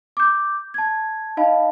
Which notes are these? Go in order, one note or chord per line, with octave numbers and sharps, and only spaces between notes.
D6 G6
A5 G#6
D#4 D#5 F5 A5 B5